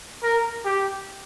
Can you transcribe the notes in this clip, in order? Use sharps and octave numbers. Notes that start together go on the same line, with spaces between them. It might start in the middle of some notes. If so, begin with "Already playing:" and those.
A#4
G4